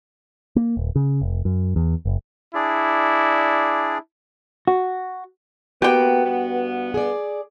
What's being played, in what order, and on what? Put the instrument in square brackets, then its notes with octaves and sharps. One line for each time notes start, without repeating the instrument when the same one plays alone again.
[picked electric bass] A#3
D#1
C#3
F1
F#2
E2
F#1
[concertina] D4 G#4 D5 [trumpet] E4
[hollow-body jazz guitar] F#4
[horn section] A#3 B3 [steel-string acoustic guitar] F#4 B4 [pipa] G4 G5
[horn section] G2 B3
[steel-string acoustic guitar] G#4 D5